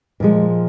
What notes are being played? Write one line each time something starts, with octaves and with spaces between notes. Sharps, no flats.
A#2 F3 G#3